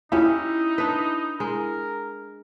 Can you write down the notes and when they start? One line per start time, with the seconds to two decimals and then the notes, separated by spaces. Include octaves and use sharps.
0.12 C#4 D#4 E4 G4
0.78 D4 B4
1.40 G#3 A#4